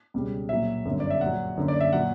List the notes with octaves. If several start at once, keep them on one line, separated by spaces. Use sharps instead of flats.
C#2 B2 G3
A#1 A#2 F#3 E5
G1 F#2 D3 F#3
D5
E5
A#1 A#2 F#3 F#5
F#1 F#2 D3
D5
E5
A#2 F#3 F#5